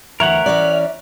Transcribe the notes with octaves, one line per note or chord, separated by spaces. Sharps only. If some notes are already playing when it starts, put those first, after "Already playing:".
D2 E3 A#4 C#5 E5 F#5
E3 C#4 D5